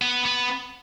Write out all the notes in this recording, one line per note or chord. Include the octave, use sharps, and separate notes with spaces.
B3
B3